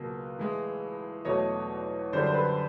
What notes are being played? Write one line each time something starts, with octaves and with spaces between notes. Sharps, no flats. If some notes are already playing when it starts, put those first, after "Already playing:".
Already playing: C#2 B2 F#3 A#3
A2 E3 G#3
E2 B2 F#3 A3 C#5 D#5
F#2 D3 G3 C5 D5
C5
A4 B4